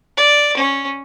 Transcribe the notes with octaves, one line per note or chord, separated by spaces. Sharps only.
D5
C#4